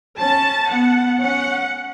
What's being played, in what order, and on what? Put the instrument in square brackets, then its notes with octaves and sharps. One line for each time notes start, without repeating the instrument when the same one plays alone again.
[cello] C#4 [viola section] A5
[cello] B3 [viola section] F#5
[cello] C#4 [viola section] F#5